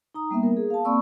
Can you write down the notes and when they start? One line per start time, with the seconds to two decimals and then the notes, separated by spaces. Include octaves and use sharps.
0.14 D#4 A#5 D#6
0.31 G3 A#3 B3 E5
0.43 A#4
0.57 G#4
0.70 F5 A5
0.85 A#3 C4 D5 B5 C#6 E6